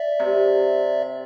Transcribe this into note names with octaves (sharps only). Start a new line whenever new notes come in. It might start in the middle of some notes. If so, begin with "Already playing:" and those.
Already playing: D5 E5
C3